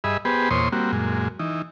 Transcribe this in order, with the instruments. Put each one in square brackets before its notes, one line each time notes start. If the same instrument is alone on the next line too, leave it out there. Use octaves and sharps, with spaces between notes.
[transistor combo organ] G2 G#4 D#5 E5 B5
B3 G4 G#4 B4 C5
E2 A#2 C5 C#5 C6 D#6
G3 A#3 C4 F#4
F#2 A#2 G#3
E3 D#4